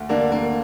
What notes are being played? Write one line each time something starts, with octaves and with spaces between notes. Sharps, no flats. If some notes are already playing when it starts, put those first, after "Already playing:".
Already playing: D2
D3 A#3 D4
D2 A#3